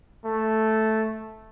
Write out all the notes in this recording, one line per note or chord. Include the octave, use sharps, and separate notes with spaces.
A3